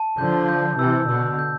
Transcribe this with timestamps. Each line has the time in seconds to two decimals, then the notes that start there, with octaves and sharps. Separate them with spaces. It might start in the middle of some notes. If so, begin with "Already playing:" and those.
Already playing: A5
0.18 D3 F3 G6
0.49 G6
0.78 C3 E3 E6
1.08 B2 D3 E6
1.39 G6